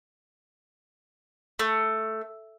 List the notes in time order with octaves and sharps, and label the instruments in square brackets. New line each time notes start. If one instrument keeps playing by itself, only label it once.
[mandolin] A3